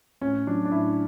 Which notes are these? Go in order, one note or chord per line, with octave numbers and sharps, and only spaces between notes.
A2 C#4
F#3 D4
D4
A2 E4